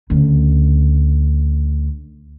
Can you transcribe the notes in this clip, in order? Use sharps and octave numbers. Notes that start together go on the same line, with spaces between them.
D2 C#3